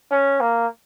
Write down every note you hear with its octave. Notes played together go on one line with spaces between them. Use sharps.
C#4
A#3